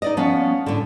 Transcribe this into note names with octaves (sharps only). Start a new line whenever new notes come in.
D#4 D5 D#5
F3 B3 C#4
A2 D3